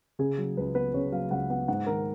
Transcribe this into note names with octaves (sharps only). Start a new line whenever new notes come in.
C#3 G#4
F#3
C#2 B4
B3 B4
C#3 C#5
F#3 F5
C#2 F#5
B3 F#5
G#2 F#5
D#3 A#4